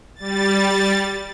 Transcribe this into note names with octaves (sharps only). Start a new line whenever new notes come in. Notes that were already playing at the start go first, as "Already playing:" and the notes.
G3 A6